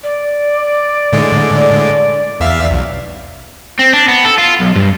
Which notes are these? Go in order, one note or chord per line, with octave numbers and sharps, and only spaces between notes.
D5
A2 D3 G#3
E2 E5 F5
B1
C4
D4
B3
A4
F4
B1
G2